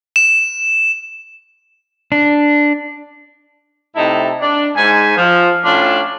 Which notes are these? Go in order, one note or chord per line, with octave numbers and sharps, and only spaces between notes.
E7
D4
A2 C3 D#4 E4 A5
D4
G#2 G#5
F3
A2 C#4 D4 F4 A5